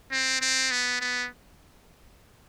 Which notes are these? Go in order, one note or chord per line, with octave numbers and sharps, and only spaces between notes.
C4
C4
B3
B3